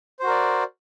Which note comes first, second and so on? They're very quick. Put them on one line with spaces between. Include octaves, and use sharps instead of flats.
C5 F#4 A#4 D5